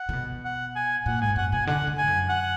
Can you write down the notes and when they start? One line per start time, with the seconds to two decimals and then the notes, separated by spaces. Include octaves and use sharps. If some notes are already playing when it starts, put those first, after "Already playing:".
Already playing: F#5
0.09 D3
0.13 B2
0.45 F#5
0.75 G#5
1.06 A#2 F#5
1.21 G#2 G#5
1.36 F#2 F#5
1.52 B2 G#5
1.67 D3 F#5
1.87 D3
1.98 G#2 G#5
2.08 F#2
2.29 F#5